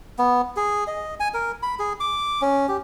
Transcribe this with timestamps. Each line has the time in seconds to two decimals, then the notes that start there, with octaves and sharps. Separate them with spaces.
0.18 B3
0.56 G#4
0.87 D#5
1.20 G#5
1.34 A#4
1.63 B5
1.79 G#4
2.00 D6
2.42 C#4
2.68 G4